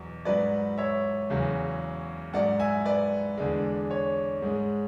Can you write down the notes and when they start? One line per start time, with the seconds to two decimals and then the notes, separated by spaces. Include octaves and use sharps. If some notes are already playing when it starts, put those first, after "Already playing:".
Already playing: E2 B2 F#3
0.25 G#2 F#3 B4 D5
0.78 C#5 E5
1.30 E2 C#3 F#3
2.34 G#2 F#3 D5 F#5
2.60 E5 G#5
2.85 B4 D5
3.38 E2 D3 G#3
3.91 C#5
4.42 G#2 G#3